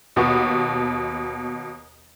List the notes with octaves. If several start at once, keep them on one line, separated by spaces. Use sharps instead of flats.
D#2 B2 B3 C#6